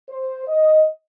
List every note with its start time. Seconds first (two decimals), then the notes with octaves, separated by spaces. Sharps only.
0.08 C5
0.47 D#5